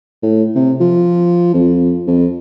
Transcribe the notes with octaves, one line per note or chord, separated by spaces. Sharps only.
A2
C3
F3
F2
F2